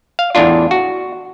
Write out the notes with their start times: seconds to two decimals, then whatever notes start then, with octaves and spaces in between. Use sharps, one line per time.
0.19 F5
0.35 E2 A2 D4 F4
0.71 F#4